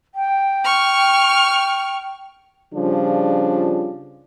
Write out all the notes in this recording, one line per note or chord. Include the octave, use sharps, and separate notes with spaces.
G5
C#6 F6
C#3 F3 G3 D4 F4